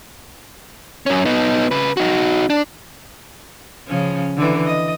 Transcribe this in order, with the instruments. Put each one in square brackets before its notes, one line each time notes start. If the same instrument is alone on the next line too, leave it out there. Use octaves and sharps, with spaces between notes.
[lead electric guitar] F#2 C#4
B3 D#4
C#3 B4
D#4 F#4
D4
[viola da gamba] C#3 F3 C#4
D3 E3
D#5